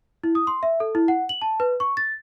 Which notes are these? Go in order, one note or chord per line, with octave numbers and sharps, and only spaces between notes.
E4
D#6
C6
E5
A4
E4
F#5
F#7
A5
B4
C#6
A6